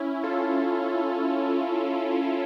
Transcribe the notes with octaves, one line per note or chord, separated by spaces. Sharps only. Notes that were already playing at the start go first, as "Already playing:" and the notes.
Already playing: C#4 E4
F4 A4